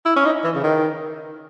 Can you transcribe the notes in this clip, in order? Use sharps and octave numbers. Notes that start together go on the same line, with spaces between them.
E4
C#4
D#4
E3
C#3
D#3